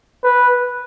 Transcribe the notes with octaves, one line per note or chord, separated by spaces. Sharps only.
B4